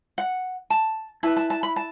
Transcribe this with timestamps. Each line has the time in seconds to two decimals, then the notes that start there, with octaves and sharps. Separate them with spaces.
0.18 F#5
0.70 A5
1.23 E4 B4 A5
1.36 A5
1.50 A5
1.63 B5
1.76 A5